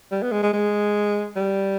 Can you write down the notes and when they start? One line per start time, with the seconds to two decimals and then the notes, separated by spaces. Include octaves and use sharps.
0.12 G3
0.22 B3
0.32 G#3
0.43 G#3
0.53 G#3
1.36 G3